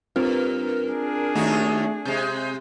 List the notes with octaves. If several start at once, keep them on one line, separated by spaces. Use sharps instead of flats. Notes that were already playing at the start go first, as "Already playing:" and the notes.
G2 C4 F4 A#4
D4 G#4
D#2 A3 D#4 F#4
C3 G#3 G6